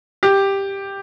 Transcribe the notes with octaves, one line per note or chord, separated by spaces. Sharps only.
G4